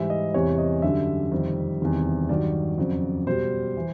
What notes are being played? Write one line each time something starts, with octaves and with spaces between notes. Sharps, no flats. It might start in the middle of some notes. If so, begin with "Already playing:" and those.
Already playing: G#2 E3 G3 E5
D#5
E2 C3 E3 G3 C#5
D#5
F#2 D3 G3 E5
F2 C3 D#3 G3
E2 C3 D#3 G3
G2 D#3 F#3 D5
F2 C#3 F#3
B2 G3 C5
E3